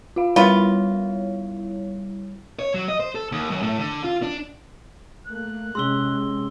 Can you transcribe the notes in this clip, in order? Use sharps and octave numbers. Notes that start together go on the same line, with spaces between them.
F4 F5
G3 B3 E4 F4 C#5
C#5
F#3
D#5
C5
A4
D#2
F#2
A2
D3
F4
D4
A3 A#3 F#6
C3 G#3 C#4 G#4 C6 E6 G7